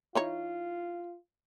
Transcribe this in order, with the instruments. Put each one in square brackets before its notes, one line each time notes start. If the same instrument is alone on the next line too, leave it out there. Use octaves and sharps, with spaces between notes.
[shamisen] E3 D#4 C#5 [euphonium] F4